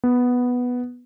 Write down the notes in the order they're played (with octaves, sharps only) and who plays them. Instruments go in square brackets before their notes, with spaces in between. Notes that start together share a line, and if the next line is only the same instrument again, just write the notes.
[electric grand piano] B3